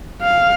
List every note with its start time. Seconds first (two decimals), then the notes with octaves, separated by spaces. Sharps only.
0.22 F5